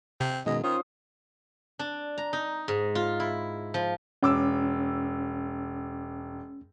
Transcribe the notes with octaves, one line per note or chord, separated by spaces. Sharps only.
C3 C4
F#2 B2 D#3 G#3 D#5
D#3 C#4 F4 C5 D#6
D4
A#5
D#4
G#2
F4
E4
F3
E1 C#4 D6 E6